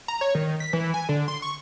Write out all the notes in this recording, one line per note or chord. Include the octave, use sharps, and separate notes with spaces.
A#5
C#5
D#3
B6
E3
G#5
D3
C6
C#6